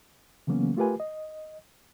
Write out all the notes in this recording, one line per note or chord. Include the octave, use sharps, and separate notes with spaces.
C#3 E3 F#3 A#3 B3 C#4
A3 F4 G4 A#4 B4 G#5
D#5